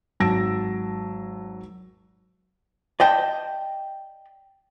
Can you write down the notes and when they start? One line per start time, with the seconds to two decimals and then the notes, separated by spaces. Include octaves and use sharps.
0.20 G#1 F#3 A5 E6 A#6 D7
3.00 D5 D#5 G5 A5